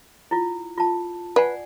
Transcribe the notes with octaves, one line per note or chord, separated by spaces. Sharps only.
E4 F4
F4 A5
B4 D5 F#5 G#5